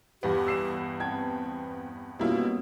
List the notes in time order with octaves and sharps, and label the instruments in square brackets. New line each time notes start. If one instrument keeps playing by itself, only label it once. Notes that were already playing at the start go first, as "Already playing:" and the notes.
[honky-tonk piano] E2 G2 B3 [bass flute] G4
[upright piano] E6 C7 E7
[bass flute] C4 [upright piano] G5 A5 G#6
[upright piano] F#2 G3 A#3 [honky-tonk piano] B2 E4 F4 [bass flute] B3